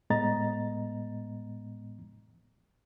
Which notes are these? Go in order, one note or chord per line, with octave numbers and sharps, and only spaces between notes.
A2 G#3 B3 D#5 A#5 A6